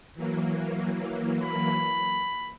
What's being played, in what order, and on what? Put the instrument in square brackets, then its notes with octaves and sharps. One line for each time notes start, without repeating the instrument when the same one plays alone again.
[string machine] E3 F#3 A#3
[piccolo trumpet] B5